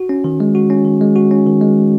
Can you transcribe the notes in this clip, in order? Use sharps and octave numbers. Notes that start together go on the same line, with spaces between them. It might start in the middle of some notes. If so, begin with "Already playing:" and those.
Already playing: F#4
C#4
D#3
G#3
F#4
C#4
D#3
G#3
F#4
C#4
D#3
G#3